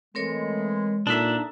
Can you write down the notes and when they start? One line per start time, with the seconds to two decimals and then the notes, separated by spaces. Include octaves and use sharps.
0.15 E3 G#3 A3 C4 A#4 C#5
1.07 A#2 D4 D#4 A4 E5 A#5